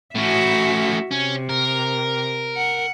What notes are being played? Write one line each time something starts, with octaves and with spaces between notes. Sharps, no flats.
A2 C#4 F#4 E5
C3 C#4
A#4
F#5